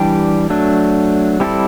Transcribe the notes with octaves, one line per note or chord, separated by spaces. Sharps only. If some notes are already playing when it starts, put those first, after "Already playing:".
Already playing: E3 G3 D4 G4
F#3 A3 D4
G3 C4 E4 A4 D5